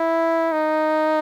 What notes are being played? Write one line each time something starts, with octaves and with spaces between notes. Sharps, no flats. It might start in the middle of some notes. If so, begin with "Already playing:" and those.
Already playing: E4
D#4